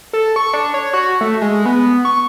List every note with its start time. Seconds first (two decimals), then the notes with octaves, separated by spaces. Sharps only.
0.13 A4
0.36 C#6
0.54 D4
0.74 C#5
0.93 F#4
1.21 A3
1.42 G#3
1.66 B3
2.05 C#6